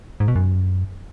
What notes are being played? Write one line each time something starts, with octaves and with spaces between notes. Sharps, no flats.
G#2
B2
F#2